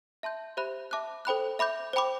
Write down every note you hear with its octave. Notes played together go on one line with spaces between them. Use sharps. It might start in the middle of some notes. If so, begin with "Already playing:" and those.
E5 A5 C6 G6
G4 C5 E5 B5 F#6
E5 A5 D6 F#6
A4 C5 G5 B5 F#6
E5 B5 D6 G6
C5 G5 B5 D6